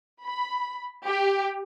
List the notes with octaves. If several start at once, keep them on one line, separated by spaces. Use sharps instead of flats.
B5
G4